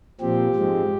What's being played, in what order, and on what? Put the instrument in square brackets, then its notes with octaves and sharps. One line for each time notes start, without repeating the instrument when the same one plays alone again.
[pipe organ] A#2 F3 C4 G4
G#2 F3 G#3 C4